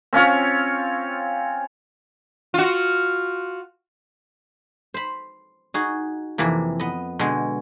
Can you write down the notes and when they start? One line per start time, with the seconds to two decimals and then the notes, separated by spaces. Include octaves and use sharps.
0.13 C4 C#4 F4 C#5
2.54 F4 F#4
4.94 C5 B5
5.74 D#4 F#4 G#4
6.38 F2 C3 E3 A#3
6.80 B3 D#5
7.19 B2 D3 G#3